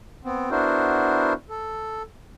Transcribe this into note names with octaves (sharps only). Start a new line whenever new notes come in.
B3 C4
B3 D4 E4 F#4 A#4 C5
A4